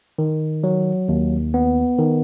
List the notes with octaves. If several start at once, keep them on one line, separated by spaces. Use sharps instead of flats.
D#3
F#3
D#2
B3
D#3